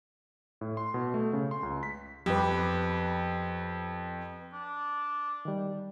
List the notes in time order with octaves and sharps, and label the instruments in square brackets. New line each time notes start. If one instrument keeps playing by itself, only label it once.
[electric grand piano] A2
C6
B2
A3
C#3
C6
C#2
B6
[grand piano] F2 [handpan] G4 B4
[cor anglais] D4
[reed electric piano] D#3 G3